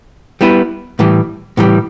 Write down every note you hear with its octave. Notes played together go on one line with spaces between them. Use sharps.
G3 B3 E4 B4
A2 E3 G3
A2 E3 G3